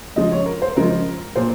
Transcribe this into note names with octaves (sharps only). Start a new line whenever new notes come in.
C#3 F3 G#3 D#5
C#5
A#4
C5
C#3 F3 G#3 A#4
A#2 C5